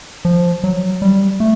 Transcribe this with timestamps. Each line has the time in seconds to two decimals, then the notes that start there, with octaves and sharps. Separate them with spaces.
0.25 F3
0.64 F#3
1.02 G3
1.40 A3